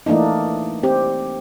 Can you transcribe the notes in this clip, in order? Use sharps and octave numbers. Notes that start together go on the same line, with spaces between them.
E3 A3 A#3 D4 D#4
C4 G4